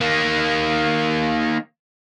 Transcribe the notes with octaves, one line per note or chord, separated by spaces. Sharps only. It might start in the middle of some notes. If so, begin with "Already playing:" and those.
D#3 A#3